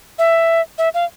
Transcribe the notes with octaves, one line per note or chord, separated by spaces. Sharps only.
E5
E5
F5